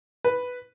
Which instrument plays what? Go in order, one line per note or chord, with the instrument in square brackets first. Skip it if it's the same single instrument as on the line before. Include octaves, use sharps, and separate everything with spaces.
[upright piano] B4